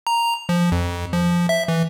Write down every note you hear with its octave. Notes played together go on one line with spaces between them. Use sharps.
A#5
F3
F2
F3
E5
E3